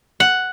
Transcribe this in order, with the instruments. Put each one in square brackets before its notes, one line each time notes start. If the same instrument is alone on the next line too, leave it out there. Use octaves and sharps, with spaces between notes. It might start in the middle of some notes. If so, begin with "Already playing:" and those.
[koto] F#5